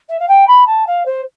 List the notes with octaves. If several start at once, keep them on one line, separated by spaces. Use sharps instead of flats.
E5
F5
G5
B5
A5
F5
C5